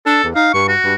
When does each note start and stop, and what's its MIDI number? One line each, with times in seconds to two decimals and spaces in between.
0.06 0.22 62
0.06 0.27 69
0.23 0.34 40
0.35 0.52 63
0.35 0.52 77
0.54 0.75 43
0.54 0.65 85
0.68 0.95 66
0.84 0.95 43